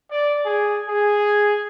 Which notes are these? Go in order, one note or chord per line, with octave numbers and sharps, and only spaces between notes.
D5
G#4
G#4